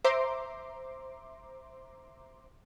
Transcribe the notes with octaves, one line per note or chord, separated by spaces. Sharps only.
C5 E5 A#5 C6 D6